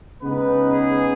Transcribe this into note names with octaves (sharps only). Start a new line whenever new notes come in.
C#3 G#3 B3 D#4 B4
G#4